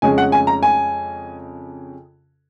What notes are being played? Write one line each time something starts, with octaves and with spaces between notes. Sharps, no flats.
F2 C#3 G#3 C#4 G#5
F#5
G#5
A#5
G#5